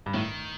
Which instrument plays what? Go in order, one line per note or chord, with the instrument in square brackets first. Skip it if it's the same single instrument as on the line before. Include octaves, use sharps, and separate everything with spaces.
[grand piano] G2
[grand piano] A2 [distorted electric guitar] D#3